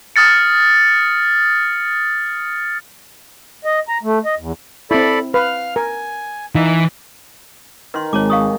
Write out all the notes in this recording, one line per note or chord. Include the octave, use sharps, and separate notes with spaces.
D#6 F6 A6 C#7
D#5
A#5
A3
D#5
E2
C4 E4 A4 D5 B5
B4 F5 F6
A#4 G#5
E3 D#4
D#3 B4 C6
G#1 G#3 C#5 A5 D6
F5 C#6 D#6